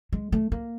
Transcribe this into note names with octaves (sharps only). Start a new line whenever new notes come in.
G#3
A3
A#3